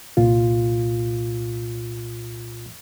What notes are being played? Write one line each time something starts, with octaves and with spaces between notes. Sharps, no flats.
C2 A#2 F4